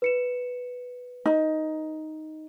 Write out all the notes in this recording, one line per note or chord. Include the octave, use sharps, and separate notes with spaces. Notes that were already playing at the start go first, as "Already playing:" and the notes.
B4 C#7 E7
D#4